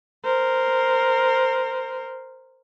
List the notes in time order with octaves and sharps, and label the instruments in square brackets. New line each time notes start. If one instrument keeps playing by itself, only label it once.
[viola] A#4 C5